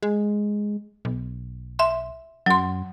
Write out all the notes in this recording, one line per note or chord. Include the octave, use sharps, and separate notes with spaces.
G#3
B1
E5 C6
F#2 F#3 C6